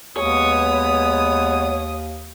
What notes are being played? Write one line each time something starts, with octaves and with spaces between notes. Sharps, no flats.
D#2 G#3 B3 C#5 D#6